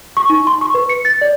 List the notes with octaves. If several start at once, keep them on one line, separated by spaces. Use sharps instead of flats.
C#6
D#4
C6
C#6
B4
C#7
A6
D5